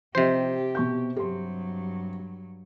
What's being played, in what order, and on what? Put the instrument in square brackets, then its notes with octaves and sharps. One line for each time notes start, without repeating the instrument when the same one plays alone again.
[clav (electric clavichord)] C3 C5 [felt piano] F3 C4 D#5 [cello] G4
[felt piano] B2 C#6 G6
[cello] G2 F#3 [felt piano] G4 C6